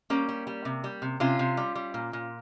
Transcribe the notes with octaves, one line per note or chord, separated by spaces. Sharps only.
G3 A#3 C#4
G3
G3
C3
G3
C3
C3 C#4 F4
C3
G3
G3
A#2
A#2